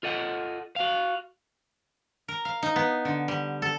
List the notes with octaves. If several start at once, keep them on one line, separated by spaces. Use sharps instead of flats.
F4 A4 D#5 F#5
F#4 F5
A#4
F5
D#4
B3
D3
G3
A4